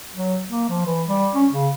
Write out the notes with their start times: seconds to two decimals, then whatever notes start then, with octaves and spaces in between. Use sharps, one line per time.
0.15 F#3
0.49 A#3
0.69 F3
0.86 E3
1.08 G3
1.35 C#4
1.52 C#3